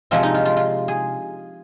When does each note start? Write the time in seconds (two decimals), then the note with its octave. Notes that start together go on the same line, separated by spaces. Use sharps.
0.11 C3 F3 G#3 C4 F4
0.23 D#4
0.34 F4
0.45 F4
0.57 F4
0.88 G#4